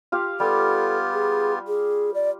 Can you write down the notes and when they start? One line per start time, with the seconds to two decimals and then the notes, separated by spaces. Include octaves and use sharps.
0.12 F4 G4 F5
0.40 G3 B3 F4 G4 A4
1.13 G#4
1.68 G#4
2.14 D5